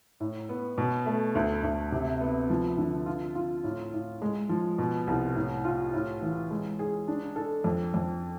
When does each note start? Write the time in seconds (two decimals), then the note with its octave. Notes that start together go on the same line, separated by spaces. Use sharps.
0.20 A2
0.49 B3
0.78 B2
1.06 A3
1.35 D2
1.63 D2
1.92 C3
2.21 B3
2.50 F3
2.78 D3
3.06 F4
3.35 F4
3.64 A2
3.93 A2
4.22 G#3
4.49 F3
4.78 B2
5.07 C2
5.35 A2
5.65 F4
5.94 A2
6.22 E3
6.51 G#3
6.79 G#4
7.08 D4
7.36 A4
7.64 F2
7.94 F2